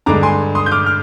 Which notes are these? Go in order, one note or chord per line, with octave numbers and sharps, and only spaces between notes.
G2 D3 G#3 A#5 D6
G#5 C6
C6 D#6
G6
D6 F6
F6